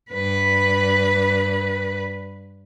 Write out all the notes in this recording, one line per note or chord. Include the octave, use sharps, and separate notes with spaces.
G2 B4